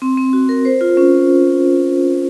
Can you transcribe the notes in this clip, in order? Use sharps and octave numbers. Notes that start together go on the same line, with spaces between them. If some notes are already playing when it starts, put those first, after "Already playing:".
C4
C4
F#4
A#4
C5
F4
C#4